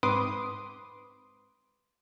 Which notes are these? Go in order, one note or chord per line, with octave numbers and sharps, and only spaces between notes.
G#2 C4 B4 C6 D6 D#6